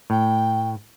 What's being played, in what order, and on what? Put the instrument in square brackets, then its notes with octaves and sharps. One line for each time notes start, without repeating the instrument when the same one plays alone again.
[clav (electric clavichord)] A2 [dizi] G5